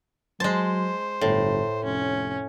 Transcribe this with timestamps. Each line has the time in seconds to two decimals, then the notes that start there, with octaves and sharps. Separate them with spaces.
0.40 F#3 G#3 C5 A5
1.21 G1 A2
1.84 F1 C#4